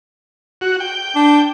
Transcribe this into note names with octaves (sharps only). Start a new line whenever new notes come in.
F#4
G5
D4